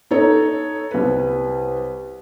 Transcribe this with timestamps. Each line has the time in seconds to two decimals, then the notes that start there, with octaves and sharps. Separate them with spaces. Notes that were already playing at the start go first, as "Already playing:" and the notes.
0.11 D#4 A4 C#5
0.91 C2 B4